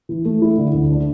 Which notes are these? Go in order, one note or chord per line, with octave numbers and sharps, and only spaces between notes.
E3
A3
E4
D3
D2
D4